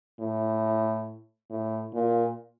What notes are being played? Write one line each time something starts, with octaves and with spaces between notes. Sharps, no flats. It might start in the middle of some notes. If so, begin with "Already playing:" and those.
A2
A2
A#2